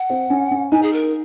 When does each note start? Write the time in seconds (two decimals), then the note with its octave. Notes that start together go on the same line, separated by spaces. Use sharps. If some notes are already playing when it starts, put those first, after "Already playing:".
Already playing: F#5
0.10 C4
0.30 C#4
0.51 C#4
0.72 D#4 G#5
0.82 G#4
0.93 A#4